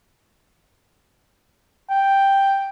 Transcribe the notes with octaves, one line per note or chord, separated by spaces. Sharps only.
G5